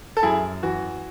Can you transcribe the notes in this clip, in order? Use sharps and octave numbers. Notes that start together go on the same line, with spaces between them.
A4
F#2 E4 G#4
E3 F#4